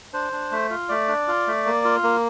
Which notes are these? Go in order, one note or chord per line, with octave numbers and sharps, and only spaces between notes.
D4 C5
D4
A3
F4
A3 D5
D4
F4
A3
A#3
F4
A#3